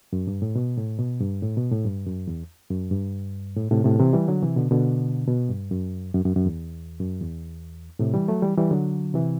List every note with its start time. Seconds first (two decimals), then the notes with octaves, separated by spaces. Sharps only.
0.13 F#2
0.27 G2
0.42 A2
0.55 B2
0.77 A2
0.99 B2
1.21 G2
1.42 A2
1.57 B2
1.71 A2
1.85 G2
2.06 F#2
2.27 E2
2.70 F#2
2.92 G2
3.56 A2
3.71 A2 C3
3.85 A2 C3
3.99 C3 E3
4.13 E3 G3
4.28 D3 F#3
4.42 C3 E3
4.56 B2 D3
4.71 B2 D3
5.28 B2
5.49 G2
5.71 F#2
6.14 F#2
6.25 F#2
6.36 F#2
6.46 E2
7.00 F#2
7.21 E2
7.99 A2 C3
8.14 E3 G3
8.28 F#3 A3
8.42 E3 G3
8.57 E3 G3
8.71 D3 F#3
9.14 C3 E3